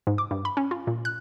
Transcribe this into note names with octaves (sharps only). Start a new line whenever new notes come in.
G#2
D6
G2
B5
C#4
F4
A#2
F#6